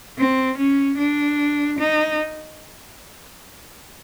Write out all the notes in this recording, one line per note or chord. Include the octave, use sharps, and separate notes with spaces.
C4
C#4
D4
D#4